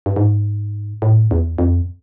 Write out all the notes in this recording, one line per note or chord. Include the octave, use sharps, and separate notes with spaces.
G2
G#2
A2
E2
F2